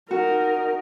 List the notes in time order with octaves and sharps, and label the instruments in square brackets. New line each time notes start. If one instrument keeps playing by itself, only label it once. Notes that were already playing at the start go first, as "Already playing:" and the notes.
[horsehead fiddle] D#4 A#4 [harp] F#4